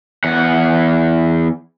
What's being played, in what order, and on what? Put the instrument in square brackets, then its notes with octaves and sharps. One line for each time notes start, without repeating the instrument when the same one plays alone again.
[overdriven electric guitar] E2 F#5